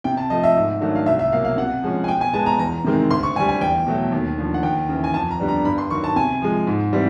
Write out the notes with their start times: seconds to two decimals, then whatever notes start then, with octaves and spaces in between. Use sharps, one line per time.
0.04 C3 G5
0.17 A5
0.30 F3 A3 D#5
0.43 E5
0.56 G#2
0.81 D#3 F#3 A3 D4
0.95 F5
1.06 C2 E5
1.19 E5
1.32 B2 F#3 A#3 F5
1.45 F5
1.58 C3 F#5
1.83 F3 G#3 C#4
2.04 G#5
2.08 B2 G5
2.21 G#5
2.34 G#3 B3 A5
2.46 A#5
2.59 E2 A#5
2.84 C3 D#3 G#3 C4
3.10 D2 C6
3.23 C#6
3.36 D3 G#5
3.40 G3
3.49 G#5
3.61 E2 G5
3.87 B2 F#3 A3
4.12 D#2
4.38 D3 F3
4.54 F#5
4.63 D#2 G5
4.89 C#3 E3
5.04 G#5
5.14 F2 A5
5.31 A#5
5.40 D3 G3 B3 D4
5.48 A#5
5.65 G2 B5
5.78 C6
5.90 D#3 F#3 C#6
6.04 A5
6.16 C3 G#5
6.42 F3 G#3
6.67 G#2
6.93 E3 G3 C4